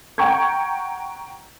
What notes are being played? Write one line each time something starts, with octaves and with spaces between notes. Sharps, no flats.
F#5 G5 A#5 C#6 G6 G#6